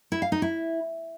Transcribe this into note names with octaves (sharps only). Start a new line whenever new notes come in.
E4
F5
D#4
E4